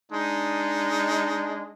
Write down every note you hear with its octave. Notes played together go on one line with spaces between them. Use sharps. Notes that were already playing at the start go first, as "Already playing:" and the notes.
G#3 D4 D#4